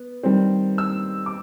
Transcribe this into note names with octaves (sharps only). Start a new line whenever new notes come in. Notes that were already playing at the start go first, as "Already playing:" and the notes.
Already playing: B3
D#3 G3 C4
E6
D6